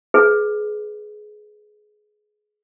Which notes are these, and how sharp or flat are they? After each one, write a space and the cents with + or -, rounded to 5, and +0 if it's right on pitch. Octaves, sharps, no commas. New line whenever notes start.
G#4 +20 B4 +0